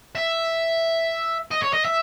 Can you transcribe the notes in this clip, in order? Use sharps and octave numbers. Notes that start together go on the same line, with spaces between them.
E5
D#5
C#5
D#5
E5